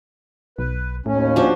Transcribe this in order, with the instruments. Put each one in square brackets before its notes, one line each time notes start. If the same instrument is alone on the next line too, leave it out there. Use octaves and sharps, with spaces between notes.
[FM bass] B1 [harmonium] B4
[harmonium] D#2 C#4 [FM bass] A2
[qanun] F3 D4 F#4